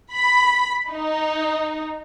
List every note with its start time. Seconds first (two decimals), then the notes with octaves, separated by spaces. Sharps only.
0.13 B5
0.90 D#4